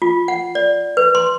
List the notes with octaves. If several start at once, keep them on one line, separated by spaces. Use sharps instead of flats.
F4
F#5
D5
B4
C6